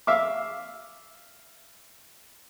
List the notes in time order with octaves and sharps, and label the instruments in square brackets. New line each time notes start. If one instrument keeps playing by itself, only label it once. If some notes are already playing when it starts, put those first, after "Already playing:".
[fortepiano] E5 F5 D6